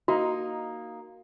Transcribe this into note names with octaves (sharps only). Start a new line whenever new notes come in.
A#3 D#4 F#4